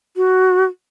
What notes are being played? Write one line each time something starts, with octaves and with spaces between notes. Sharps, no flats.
F#4